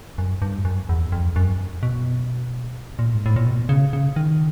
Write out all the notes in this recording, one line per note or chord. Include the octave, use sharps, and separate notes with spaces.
F#2
G2
F#2
E2
F2
F#2
B2
A#2
G#2
A2
A#2
B2
C#3
C#3
D#3